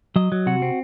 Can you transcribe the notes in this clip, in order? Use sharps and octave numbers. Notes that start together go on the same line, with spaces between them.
F#3 D#5
F#3
C3 F#4
C4